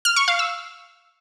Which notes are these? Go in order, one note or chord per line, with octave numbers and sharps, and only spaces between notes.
F6
C#6
F5
E6